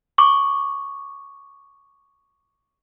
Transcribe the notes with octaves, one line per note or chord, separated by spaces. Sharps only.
C#6 D6